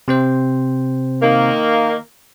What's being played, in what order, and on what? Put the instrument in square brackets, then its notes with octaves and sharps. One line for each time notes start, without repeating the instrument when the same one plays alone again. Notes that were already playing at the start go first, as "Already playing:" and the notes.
[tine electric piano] C3 C4 C5
[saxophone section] D#3 A#3